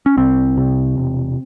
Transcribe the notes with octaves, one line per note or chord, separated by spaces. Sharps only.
C#4
C2 C4
C3
E1